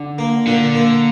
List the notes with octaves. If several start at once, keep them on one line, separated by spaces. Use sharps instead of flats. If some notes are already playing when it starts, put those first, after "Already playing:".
Already playing: D3
A#3
A#2 D3
A#3